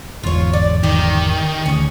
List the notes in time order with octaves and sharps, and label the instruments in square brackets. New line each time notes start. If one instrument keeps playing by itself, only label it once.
[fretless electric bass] G1 E2 G#2 [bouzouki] F4 C#5
[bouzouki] D5
[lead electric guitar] D#3 [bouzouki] G4
[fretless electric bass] D2 [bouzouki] C#4 G#4